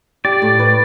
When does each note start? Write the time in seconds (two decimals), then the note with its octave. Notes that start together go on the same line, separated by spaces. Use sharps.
0.24 G4 D5
0.42 A2
0.59 B4